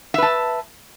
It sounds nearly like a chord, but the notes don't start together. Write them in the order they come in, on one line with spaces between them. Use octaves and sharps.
E5 B4 A5